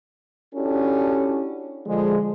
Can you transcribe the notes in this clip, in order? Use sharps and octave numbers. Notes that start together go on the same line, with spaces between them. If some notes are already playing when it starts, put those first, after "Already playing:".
C#4 D4 E4 F#4 G4 A4
D3 F3 G#3